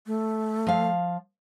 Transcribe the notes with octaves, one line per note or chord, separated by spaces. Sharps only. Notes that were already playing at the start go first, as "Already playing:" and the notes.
A3
F3 F5